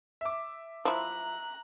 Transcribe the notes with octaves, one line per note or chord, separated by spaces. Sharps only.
E5 D6
F3 E4 A#5 F#6